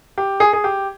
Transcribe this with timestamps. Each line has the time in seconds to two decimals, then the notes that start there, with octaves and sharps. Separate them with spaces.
0.18 G4
0.40 G#4
0.53 G#4
0.64 G4